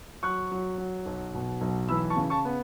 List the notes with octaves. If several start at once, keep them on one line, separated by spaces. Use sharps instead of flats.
F#3 C#6 F#6
F#3
F#3
B1
B2
B1
E3 B5 E6
A5 C#6
C#3
A5 C#6
B3